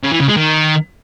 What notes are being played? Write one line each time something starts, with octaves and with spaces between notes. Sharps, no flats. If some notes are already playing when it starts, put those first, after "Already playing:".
C#3
E3
C#3
G#3
D#3